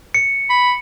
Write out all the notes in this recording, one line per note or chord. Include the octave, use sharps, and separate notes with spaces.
C#7
B5